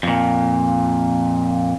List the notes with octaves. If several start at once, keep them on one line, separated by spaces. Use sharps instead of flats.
F2 A#2